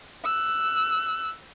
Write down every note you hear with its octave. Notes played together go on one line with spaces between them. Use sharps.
E6 F#6